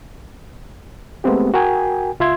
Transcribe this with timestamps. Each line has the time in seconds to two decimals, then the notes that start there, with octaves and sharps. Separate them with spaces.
1.24 G#3 A3 B3 C4 G4
1.54 F#4 A#4 G5 G#5
2.20 C#2 F4 E5 C6 G#6